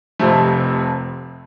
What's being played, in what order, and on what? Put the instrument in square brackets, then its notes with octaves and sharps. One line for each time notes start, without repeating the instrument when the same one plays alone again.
[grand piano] F1 F2 C3 F3 A3